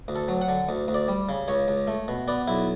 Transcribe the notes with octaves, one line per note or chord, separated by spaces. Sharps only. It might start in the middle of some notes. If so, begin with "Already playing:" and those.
D2
A4
F#3
F#5
D3
D2
D2
D5
G3
C#3
C#2 C#5
C#2
A3
B2
B3 D5
B1 E4